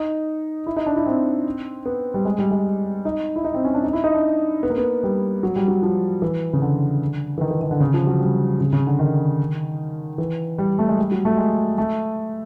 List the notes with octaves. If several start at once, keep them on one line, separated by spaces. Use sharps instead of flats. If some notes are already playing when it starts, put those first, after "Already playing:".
Already playing: D#4
E4
D#4
D4
E4
C4
B3
G3
G#3
G3
G#3
D#4
E4
D#4
C4
C#4
D4
D#4
E4
D#4
D4
B3
A#3
B3
G3
F#3
G3
F#3
F3
E3
C#3
D3
E3
D#3
E3
D#3
D3
C#3
F3
F#3
G3
C#3
C#3
D3
D#3
E3
G3
A3
G#3
G3
F#3
A3
G#3
A3